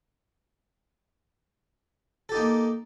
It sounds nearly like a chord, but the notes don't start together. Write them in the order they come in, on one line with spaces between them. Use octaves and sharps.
A4 G4 D#4 A#3